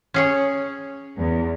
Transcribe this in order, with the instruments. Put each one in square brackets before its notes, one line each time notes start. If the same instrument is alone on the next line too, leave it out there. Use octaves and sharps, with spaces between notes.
[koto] C#4 G#4 C#5
[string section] E2